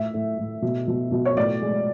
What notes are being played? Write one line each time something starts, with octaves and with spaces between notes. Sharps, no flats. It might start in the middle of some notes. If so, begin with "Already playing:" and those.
Already playing: A2 E5
A2
A2
B2
B2
B2
C#5
A2 D5
G#3